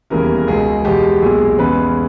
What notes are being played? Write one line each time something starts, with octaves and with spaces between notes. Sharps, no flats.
E1 D#2 C#3 E3 G3 A#4
A#4
C#2 B2 G#3 G#4
E2 B2 G#3 G4
B1 A#2 G#3 G#4
E2 C#3 G#3 B4